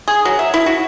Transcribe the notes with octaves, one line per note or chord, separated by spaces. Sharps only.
G#4
F#3
E5
E4
F#4